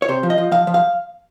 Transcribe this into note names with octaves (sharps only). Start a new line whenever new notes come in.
C#5
C3 C5
F3
D#5
F3
F3 F5
F3
F5